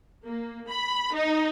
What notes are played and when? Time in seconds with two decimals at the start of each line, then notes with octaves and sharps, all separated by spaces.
0.24 A#3
0.69 B5
1.14 D#4